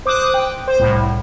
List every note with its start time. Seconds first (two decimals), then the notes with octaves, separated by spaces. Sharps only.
0.06 C5 D6 D#6 F#6
0.34 G5
0.68 C5
0.80 C2 A2